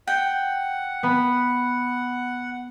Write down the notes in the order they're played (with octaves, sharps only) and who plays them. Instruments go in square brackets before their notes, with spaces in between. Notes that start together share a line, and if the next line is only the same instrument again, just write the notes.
[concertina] F#5 [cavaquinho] G5
[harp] B3 B5